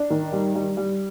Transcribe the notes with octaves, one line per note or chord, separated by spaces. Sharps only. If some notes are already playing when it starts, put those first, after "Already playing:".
Already playing: D4
D#3
G3
G3
G3